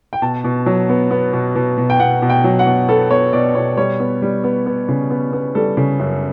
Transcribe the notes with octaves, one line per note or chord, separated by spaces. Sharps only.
G5
B2 A5
B2
F#3
B3
B3
B2
B2
B2
G5
B2 F#5
B2
G5
F#3
F#5
B2
B3 A4
B3 C#5
B2 D5
B2 C#5
G3 C#5
B3
G3
B3
B3
C#3
B3
B3
G3 A4
C#3
F#2